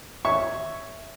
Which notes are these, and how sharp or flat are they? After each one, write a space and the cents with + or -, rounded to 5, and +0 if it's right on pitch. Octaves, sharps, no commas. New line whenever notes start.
C#5 +0 E5 +0 C#6 +0